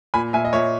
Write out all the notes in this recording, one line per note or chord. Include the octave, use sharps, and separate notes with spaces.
A#2 G#5 B5
A#2 E5 G#5
D#5
A#2 C#5 E5